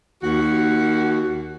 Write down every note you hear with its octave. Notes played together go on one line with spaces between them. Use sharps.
D#2 F#4